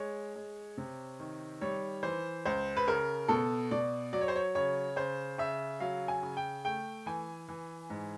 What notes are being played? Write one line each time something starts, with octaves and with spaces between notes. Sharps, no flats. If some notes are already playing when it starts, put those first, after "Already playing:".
Already playing: G#3 C#5
G#3
C3
D#3
G3 C#5
E3 C5
C#2 C5
B4
C#3 A#4
B2 A4
B2 D5
F#3 D5
C#5
C5
C#5
C#3 C#5
C#3 C5
C#3 E5
F#3 F5
G#5
C#3
G5
A3 G5
E3 G#5
E3
G#2